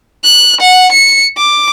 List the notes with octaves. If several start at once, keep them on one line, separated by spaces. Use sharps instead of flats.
F#6
F#5
C#7
D6